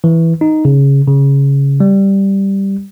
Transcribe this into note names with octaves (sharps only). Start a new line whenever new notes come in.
E3
D#4
C#3
C#3
G3